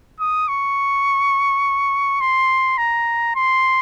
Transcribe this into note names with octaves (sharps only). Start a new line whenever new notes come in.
D#6
C#6
C6
A#5
C6